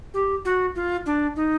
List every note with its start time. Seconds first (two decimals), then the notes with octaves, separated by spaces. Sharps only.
0.14 G4
0.45 F#4
0.76 F4
1.06 D4
1.36 D#4